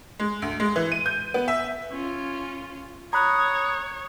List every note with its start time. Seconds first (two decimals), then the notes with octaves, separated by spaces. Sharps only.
0.20 G#3
0.42 D2
0.60 G#3
0.76 E3
0.92 D#7
1.06 G6
1.34 B3
1.48 E5
1.91 C#4 F4
3.13 C#5 A#5 B5 D#6 F#6